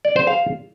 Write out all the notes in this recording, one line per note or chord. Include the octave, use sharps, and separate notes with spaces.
D5
C5
F5